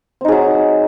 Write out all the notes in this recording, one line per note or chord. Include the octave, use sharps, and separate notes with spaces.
F#3 C4 D#4 G#4